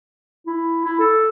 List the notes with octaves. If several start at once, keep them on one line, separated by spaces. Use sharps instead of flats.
E4
E4
A4